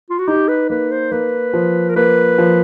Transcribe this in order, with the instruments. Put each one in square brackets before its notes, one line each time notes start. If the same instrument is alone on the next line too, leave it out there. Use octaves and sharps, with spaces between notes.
[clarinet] F4
F#4
[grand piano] D#4 [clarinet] G4
[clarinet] B4
[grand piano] A#3 [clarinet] B4
[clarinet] C5
[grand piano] A#3 [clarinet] B4
[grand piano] F3
[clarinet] A#4
[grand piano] A#3 [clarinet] B4
[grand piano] F3